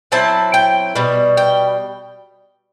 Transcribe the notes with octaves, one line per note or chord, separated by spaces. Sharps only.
F#3 C4 E4 A5
G5
B2 G3
G5